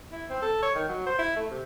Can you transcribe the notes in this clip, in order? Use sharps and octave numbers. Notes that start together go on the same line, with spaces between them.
E4
C4
A4
C#5
D#3
F#3
C5
E4
A3
C3